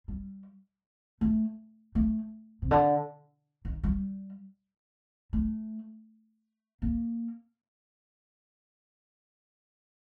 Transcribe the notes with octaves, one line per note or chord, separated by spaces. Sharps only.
G3
A3
A3
C3
D3
D#3
G3
A3
A#3